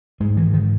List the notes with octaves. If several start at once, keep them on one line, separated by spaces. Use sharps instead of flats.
G#2 G#3
E3
D#3